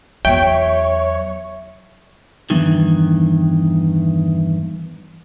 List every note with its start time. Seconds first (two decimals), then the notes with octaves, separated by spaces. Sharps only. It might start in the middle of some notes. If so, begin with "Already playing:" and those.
0.25 E2 F#3 C#5 E5 G5
2.50 E2 G2 D#3 E3